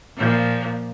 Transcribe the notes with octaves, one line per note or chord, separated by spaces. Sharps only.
A#2 F3